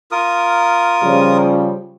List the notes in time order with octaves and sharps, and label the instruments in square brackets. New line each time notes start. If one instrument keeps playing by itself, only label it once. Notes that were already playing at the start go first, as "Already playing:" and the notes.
[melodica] F4 A#4 D#6
[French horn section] C#3 F3 G3